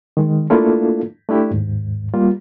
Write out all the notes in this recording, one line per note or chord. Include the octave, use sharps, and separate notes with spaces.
D#3 G#3
A3 A#3 D4 E4 F4 A4
A3 D4 E4 G4
D#2 G#2
G3 A#3 F4